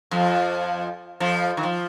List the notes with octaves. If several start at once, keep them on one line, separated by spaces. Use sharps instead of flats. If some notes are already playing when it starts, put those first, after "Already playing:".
F2 F3
F2 F3
D#3
F3